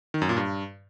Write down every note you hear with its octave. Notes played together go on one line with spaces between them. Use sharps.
D#3
F#2
A#2
G2